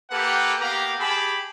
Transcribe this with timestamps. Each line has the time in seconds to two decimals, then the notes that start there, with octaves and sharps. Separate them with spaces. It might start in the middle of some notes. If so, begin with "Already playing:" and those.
0.10 A#3 G4 A4 B4 F#5
0.60 A#3 B3 G4 F5 A#5
0.99 G4 G#4 A5 B5